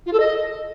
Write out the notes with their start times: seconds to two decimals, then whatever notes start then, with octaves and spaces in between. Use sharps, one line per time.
0.06 F4
0.13 A4
0.20 D#5